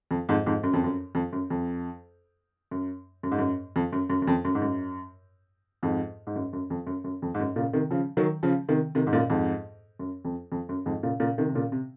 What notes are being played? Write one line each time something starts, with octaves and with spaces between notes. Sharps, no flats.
F2
F2 G#2
F2 G#2
F#2
F2
F#2
F2
F#2
F2
F#2
F#2
G#2
F#2
F2
F#2
F#2
F#2
F2
F#2
G#2
F#2
F2 G#2
G#2
F#2
F#2
F2
F#2
F#2
F2
G#2
F#2
A#2 C#3
C3 D#3
C#3 F3
D#3 F#3
C#3 F3
C3 D#3
C3 D#3
G#2
F#2 A#2
F2 G#2
F#2
F2
F2
F#2
F2 G#2
A#2 C#3
A#2 C#3
C3 D#3
C3
A#2 C#3
C3